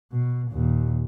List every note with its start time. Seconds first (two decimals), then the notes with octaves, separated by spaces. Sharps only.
0.12 B2
0.51 D#2 A#2